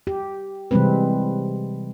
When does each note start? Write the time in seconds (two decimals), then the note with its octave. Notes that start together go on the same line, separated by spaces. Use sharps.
0.07 G4
0.71 C3 E3 G3 G#3 C4 B4